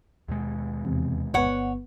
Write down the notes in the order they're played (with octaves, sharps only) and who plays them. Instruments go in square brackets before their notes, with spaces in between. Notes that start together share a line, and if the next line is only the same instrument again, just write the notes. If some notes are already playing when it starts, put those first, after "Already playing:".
[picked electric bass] D#2 B2 G#3
[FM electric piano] E2 C3
[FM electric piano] G1 B3 [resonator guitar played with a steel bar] C#5 F#5